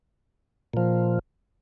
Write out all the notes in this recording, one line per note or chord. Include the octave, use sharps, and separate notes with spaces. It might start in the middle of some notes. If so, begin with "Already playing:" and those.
A#2 F3